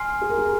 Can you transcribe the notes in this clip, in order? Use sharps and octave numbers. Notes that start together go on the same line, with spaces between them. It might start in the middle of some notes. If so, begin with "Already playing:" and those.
Already playing: G#5 C6 F6 C7
G#4
A#4
G#4
A#4